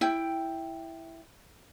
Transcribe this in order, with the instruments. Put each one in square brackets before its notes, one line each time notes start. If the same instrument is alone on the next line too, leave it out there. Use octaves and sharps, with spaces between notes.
[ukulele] E4 G5